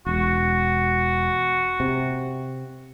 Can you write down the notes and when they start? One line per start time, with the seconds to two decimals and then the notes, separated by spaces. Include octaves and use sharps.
0.07 E1 F#4
1.80 C3